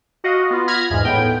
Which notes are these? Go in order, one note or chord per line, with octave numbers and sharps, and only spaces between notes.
F#4 D#5 F5
B3 F4
B5 F6 G#6 A#6
E2 G#2
A2 B3 G5